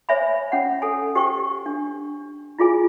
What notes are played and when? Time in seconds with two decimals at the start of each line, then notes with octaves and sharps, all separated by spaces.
0.09 C5 C#5 E5 G#5 B5
0.52 C#4 F#5
0.82 A4 G#5
1.15 G4 C5 G5 C#6
1.66 D4
2.59 E4 F4 G#4 G#5